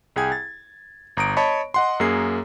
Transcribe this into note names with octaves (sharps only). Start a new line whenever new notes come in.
C2 G#4 G5 G#5 G#6
A6
G1 A#5 D#6 D7
C#5 D#5 A5 B5 C#6
D#5 F#5 C6
F#2 A#3 G#4 C7